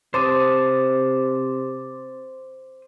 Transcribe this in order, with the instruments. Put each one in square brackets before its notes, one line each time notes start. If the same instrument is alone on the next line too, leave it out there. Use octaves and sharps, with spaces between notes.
[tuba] C3 [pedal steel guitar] C5 A5 D#6 [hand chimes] C6 D6 A6